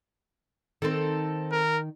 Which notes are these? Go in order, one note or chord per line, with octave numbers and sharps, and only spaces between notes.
D#3 C4 D#4 A4
A#4